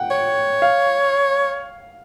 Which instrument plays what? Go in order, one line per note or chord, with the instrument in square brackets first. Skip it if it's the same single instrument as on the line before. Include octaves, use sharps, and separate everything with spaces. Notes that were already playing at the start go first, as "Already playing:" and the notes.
Already playing: [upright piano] F#5 G5
[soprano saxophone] C#5
[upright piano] F5